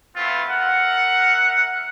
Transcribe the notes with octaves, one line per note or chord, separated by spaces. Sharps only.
A3 B3 C4 E4 F4
A#4 E5 F#5